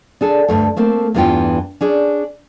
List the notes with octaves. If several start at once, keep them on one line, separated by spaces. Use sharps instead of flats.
D4 G#4 A4
D2 G2 A3
A3 A#3 C4
E2 G2 E3 B3 F4 G5
C#4 D4 G#4